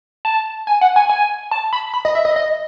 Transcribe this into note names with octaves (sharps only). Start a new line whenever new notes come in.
A5
G#5
F#5
G#5
G#5
A5
B5
B5
D#5
E5
D#5
D#5